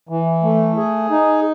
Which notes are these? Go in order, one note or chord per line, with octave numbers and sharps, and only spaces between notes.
E3
A3
G#4
D#4